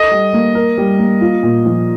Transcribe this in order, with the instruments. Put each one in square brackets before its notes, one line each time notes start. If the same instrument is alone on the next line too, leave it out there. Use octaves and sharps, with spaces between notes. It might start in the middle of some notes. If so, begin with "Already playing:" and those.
Already playing: [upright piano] A4 [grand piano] D#5
[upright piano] G3
A#3
A#4
G3
A#3
F4
A#2
F3